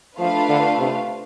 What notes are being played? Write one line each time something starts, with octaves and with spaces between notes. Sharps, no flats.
F3 A3 D4 F4 B4 F5
D3
C3